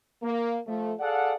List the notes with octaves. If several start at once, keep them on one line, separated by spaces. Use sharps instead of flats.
A#3
F3 A3
G#4 A4 D5 F5 F#5